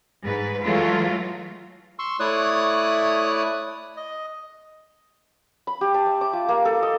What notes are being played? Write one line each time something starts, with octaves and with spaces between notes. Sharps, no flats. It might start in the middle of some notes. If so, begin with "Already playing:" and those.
G#2 B4
E3 F#3 G#3 A3 F4
C6 C#6 E6
A3 E4 C#5 D5 D#6 F#6
D#5
B5
G4
A5
E5
D6
F4
A#3
A4
D#5